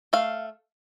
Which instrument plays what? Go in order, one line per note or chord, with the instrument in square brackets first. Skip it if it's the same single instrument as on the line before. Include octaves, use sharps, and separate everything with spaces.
[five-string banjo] A3 F5